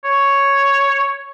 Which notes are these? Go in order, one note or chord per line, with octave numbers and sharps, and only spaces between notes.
C#5